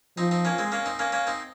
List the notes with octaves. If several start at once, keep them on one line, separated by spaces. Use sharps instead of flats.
F3 C4 D#4
C4 D#4
A#3 C#4
G#3 C4
A#3 C#4
C4 D#4
A#3 C#4
A#3 C#4
C4 D#4